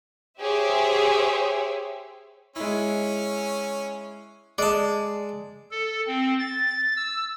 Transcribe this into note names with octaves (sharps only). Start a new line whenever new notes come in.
G4 G#4 C5 C#5 E5
G#3 C#4 E4
G#3 D5 A5
A4
C4
A6
E6